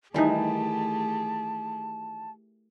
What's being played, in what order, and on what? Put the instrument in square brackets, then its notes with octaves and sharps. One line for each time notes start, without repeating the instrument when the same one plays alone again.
[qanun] D#3 E3 [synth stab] G3 D#4 [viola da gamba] A3 G4 G#4 [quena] A5